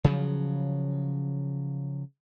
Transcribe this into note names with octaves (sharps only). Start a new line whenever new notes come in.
C#3 F3 F#3